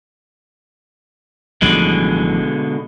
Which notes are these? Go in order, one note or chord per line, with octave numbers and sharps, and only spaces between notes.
A1 B2 D3 F3 G3 G#3